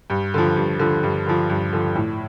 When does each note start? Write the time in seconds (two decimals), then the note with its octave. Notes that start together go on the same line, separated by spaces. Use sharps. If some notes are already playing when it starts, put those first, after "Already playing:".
0.10 G2
0.34 D3 F3
0.56 G2
0.79 D3 F3
1.03 G2
1.26 D3 F3
1.49 G2
1.73 D3 F3
1.95 A2